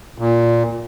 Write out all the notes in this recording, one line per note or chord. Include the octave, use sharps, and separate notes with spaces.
A#2